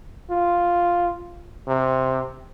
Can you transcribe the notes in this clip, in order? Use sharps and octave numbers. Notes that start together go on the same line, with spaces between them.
F4
C3